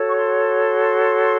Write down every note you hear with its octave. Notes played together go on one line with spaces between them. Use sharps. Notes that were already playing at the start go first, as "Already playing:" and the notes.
Already playing: F#4 A4 C#5
C#6
C6